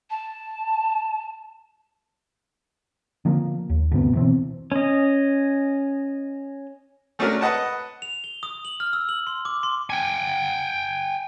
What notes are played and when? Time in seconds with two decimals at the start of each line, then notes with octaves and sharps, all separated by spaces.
0.10 A5
3.25 D3 F3 A#3
3.69 D#2
3.92 D2 G2 C3 B3
4.14 B2 E3 C4
4.72 C#4 D#5
7.19 G#3 A3 C#4 D4 F#4 A#4
7.41 B4 D#5 F#5 A5
8.02 F7
8.24 G7
8.43 D#6
8.65 F#7
8.80 F6
8.93 E6
9.09 F#7
9.27 C6
9.45 D6
9.63 C6
9.90 G5 G#5